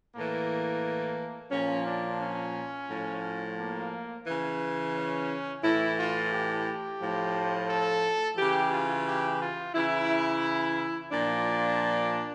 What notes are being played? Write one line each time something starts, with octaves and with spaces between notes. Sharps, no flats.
A2 E3 A#3
A#2 F3 C#4
D4
C#4
A2 F3
A#3
C#3 E3
C#4
A2 E3 E4
F4
G4
A2 F3
A4
C#3 E3 G4
F4
G4
F4
C#3 E3 E4
A#2 F3 D4